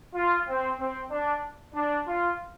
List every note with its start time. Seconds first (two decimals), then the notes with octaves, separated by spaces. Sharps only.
0.15 F4
0.48 C4
0.79 C4
1.11 D4
1.75 D4
2.07 F4